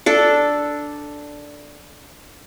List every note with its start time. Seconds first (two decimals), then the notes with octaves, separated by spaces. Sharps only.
0.06 D4 A4